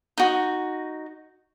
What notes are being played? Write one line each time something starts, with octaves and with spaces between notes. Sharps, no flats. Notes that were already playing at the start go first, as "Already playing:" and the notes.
D#4 F#4